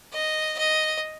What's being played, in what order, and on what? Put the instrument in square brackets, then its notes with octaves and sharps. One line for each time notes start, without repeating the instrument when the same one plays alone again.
[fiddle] D#5
D#5